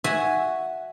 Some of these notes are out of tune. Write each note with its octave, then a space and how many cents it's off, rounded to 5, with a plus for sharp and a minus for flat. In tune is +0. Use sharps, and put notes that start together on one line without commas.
F#4 +0 E5 +0 G#5 +0